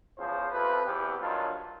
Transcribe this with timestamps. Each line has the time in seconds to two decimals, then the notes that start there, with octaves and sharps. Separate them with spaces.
0.18 E2 C#3 F3 C5
0.52 F2 C3 F3 B4
0.86 E2 C3 E3 G4
1.20 G2 D#3 F#3 F4